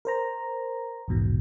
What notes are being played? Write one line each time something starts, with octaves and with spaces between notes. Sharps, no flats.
A#4 C5 A#5
A#1 E2 G#2 B2